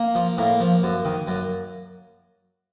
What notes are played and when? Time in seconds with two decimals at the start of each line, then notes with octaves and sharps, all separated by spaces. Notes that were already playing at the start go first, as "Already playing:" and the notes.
Already playing: A#3
0.15 F3
0.37 A2 A#3
0.60 F3
0.83 F#2
1.05 D#3
1.27 F#2